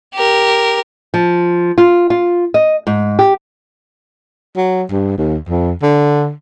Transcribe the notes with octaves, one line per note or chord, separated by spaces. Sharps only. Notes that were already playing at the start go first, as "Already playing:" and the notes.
G4 A#4
F3
F4
F4
D#5
G#2
G4
F#3
G2
D#2
F2
D3